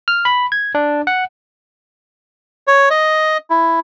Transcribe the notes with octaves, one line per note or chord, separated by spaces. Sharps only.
F6
B5
G#6
D4
F#5
C#5
D#5
E4